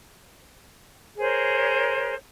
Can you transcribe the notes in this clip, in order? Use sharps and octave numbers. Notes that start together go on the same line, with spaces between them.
G#4 A#4 C5 C#5